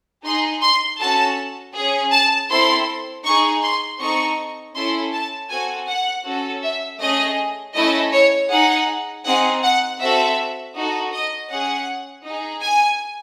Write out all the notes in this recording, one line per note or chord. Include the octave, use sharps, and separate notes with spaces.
D#4 G#4 C6
C6
C#4 F#4 A4 A5
C#4 G#4
A5
C4 E4 A4 C6
D#4 G#4 C#6
C6
C4 D#4 A4 C#6
C#4 E4 A4 C6
A5
C4 F#4 A4 G#5
F#5
C#4 F#4 A4
E5
A3 C#4 G#4 D#5
A3 C#4 E4 A4 D#5
C#5
D#4 G#4 F#5
C4 D#4 G#4 F#5
F#5
C4 F#4 A4 E5
D#4 F#4 A4
D#5
C#4 G#4 F#5
D#4
G#4
G#5